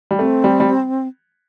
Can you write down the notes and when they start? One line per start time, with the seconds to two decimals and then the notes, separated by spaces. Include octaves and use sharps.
0.11 G3
0.19 A3 C4
0.44 G3
0.60 G3